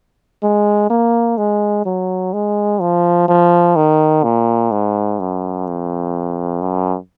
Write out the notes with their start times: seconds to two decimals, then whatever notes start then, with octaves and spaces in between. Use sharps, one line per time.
0.43 G#3
0.90 A#3
1.38 G#3
1.86 F#3
2.33 G#3
2.81 F3
3.28 F3
3.76 D#3
4.24 A#2
4.71 G#2
5.19 F#2
5.67 F2
6.61 F#2